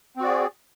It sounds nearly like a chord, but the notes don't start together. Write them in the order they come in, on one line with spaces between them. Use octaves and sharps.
C4 F#4 D5 G#4